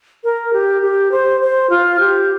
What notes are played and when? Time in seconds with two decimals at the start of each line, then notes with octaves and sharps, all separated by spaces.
0.24 A#4
0.53 G4
0.82 G4
1.11 C5
1.41 C5
1.70 F4
2.00 G4